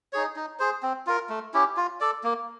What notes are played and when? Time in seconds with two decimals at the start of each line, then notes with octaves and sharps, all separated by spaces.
0.13 D#4 G#4 C#5
0.36 D#4
0.59 G#4 C5
0.83 C4
1.07 F4 A#4
1.29 A3
1.54 C#4 E4 G4
1.77 F4
2.00 A4 D5
2.24 A#3